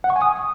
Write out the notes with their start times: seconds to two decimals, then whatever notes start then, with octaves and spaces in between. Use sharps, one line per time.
0.04 F#5
0.10 C#6
0.16 G#5
0.22 D#6